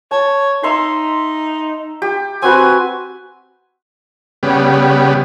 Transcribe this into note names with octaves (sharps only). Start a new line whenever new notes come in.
C#5 A5
D#4 E5 A#5 C6
G4
C4 F#4 B4 G#5
C#3 G3 B3